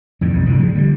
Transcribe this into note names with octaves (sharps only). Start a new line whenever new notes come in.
F2 A2 D#3
B1 F2 G#2
F1 G#2 B2 D3
F3 G#3
D3 G3